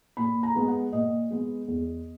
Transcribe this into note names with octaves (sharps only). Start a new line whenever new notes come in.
A#2 B5
A#5
G#3 B3
F#5
A#2 D#5
G#3 B3
E2